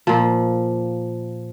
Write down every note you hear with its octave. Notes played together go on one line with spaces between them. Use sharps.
A#2 F3